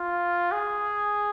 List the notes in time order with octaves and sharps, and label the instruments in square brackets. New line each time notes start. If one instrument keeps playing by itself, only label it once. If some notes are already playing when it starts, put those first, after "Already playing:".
Already playing: [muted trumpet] F4
G#4